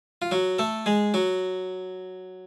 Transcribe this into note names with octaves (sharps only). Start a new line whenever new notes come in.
F4
F#3 F#4
A3 A4
G#3 G#4
F#3 F#4